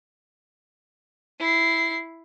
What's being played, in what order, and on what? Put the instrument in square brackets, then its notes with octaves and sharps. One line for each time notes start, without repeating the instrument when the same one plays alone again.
[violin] E4 C7